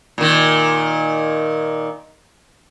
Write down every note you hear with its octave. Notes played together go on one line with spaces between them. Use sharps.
A#2 D#3